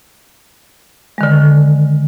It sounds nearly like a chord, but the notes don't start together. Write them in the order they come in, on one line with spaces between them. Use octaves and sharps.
G#3 D#3 D3